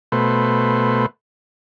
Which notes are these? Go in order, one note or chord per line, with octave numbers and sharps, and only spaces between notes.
B2 A3 B4 C5